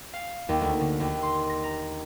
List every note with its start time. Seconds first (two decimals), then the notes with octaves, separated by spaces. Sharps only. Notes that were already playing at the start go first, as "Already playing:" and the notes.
0.13 F5
0.49 D#2
0.61 D2
0.81 D3
1.00 D#2
1.22 C6
1.50 A#6
1.63 A#5